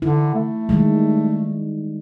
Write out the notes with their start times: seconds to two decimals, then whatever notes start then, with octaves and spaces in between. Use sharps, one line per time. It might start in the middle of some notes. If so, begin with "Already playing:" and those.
0.02 D3 E4
0.35 A3
0.69 D#3 G3 G#3